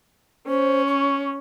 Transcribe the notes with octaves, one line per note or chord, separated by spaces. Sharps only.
C#4 C5
C#6